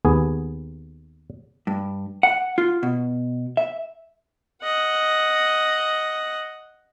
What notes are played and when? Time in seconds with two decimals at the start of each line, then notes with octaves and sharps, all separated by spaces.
0.05 D#2 B3 G#4
1.67 G2
2.23 F#5
2.58 F4
2.83 B2
3.57 E5
4.63 D#5 F#5